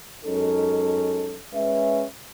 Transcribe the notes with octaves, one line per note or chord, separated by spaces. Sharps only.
F#2 G#3 C#4 D#4 A4
G#3 C#4 B4 E5